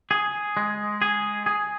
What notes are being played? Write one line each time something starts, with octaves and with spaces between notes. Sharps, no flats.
G#4
G#3
G#4
G#4